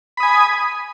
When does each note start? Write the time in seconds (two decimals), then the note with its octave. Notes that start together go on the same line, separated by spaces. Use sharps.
0.17 B5
0.20 D#6
0.23 G#5